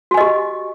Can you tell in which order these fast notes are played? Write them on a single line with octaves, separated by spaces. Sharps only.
F#4 G#5 D#5 G4